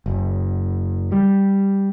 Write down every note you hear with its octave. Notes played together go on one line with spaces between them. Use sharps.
F#1
G3